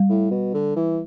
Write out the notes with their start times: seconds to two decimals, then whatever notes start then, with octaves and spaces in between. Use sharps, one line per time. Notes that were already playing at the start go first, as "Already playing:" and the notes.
Already playing: G3
0.09 A2
0.31 B2
0.54 D3
0.76 E3